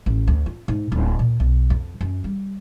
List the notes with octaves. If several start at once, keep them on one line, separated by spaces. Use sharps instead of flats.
A1
D2
F4
G#2
D1
A#2
B1
F2
F#2
G3